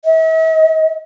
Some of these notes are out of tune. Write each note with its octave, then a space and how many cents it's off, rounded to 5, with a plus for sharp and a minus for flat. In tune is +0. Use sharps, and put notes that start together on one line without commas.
E5 -45